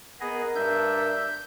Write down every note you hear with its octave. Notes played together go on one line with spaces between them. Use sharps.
B3 G#4 A#4 D#5
G2 D4 E5 G6